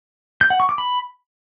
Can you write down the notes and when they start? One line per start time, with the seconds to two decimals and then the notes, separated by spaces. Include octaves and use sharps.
0.41 G6
0.50 F#5
0.60 C#6
0.69 D6
0.78 B5